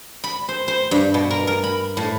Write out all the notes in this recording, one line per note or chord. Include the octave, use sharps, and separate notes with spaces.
B5
C5
C5
G2
B2
A#4
A#4
B5
A2